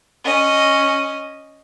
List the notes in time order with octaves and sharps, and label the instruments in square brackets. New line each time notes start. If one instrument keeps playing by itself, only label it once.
[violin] C#4 D#5